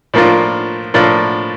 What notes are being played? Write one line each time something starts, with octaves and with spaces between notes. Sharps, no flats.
A2 F3 A#3 D4 F4
A2 F3 A#3 D4 F4